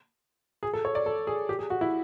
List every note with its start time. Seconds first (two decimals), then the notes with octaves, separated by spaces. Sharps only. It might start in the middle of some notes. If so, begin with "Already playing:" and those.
0.63 G#4
0.73 A4
0.85 C#5
0.95 D5
1.06 A4
1.27 G#4
1.49 G4
1.59 G#4
1.70 F#4
1.81 E4